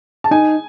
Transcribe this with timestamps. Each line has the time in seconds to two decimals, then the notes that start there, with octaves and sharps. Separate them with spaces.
0.24 A5
0.31 D#4 G#5